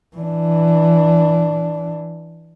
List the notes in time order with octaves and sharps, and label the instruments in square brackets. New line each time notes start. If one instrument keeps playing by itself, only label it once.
[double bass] E3 D4